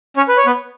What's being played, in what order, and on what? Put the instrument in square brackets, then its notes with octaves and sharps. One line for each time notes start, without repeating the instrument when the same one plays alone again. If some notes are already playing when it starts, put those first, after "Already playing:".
[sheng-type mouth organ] C#4 C#5
B4
C#5
B3 B4